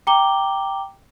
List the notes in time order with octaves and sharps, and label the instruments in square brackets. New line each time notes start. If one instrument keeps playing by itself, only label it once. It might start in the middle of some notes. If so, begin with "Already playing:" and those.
[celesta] G5 A#5 D6 G7